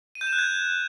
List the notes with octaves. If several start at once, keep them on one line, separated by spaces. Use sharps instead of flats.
D#7
G6
E7
F#6
G#6